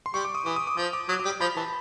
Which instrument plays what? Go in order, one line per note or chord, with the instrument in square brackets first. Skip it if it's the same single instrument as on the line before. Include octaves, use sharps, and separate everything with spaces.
[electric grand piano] C6
[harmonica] G3 [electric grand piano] C#6
[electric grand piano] D6
D#6
[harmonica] E3 [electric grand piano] D6
[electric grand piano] D#6
D6
[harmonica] F3 [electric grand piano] D#6
[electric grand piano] D6
[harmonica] F#3 [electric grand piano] D#6
[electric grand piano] D6
[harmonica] G3
[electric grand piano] D#6
[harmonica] F3 [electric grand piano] B5
[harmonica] E3 [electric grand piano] A5